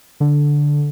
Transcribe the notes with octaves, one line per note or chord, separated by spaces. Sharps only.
D3